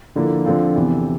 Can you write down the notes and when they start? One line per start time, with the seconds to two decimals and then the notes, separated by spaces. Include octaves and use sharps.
0.15 D3 F3 A#3 E4 A4
0.45 D3 F3 C4 F4
0.76 E2 C3 E3